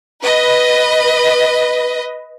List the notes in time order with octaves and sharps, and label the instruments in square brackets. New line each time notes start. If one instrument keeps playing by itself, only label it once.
[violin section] B4 D#5